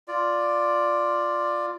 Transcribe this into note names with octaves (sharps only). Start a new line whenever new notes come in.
F4 D5